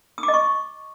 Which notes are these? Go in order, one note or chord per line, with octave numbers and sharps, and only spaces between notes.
D#6
D6
D#5
C#6